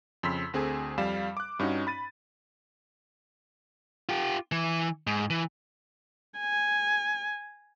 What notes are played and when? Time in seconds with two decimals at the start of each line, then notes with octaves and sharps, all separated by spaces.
0.23 F2 C#3 C6 E6 B6
0.53 D2 C4 G#4 A4 G#5
0.98 F2 G3 F5 E7
1.37 D6 F#6
1.59 G2 C#4 D#4 F#4
1.87 B5 A6 D#7
4.09 F4 G4
4.52 E3
5.07 G#2
5.30 E3
6.39 G#5